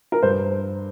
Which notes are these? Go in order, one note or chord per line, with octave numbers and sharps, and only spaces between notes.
A#4
G2 C5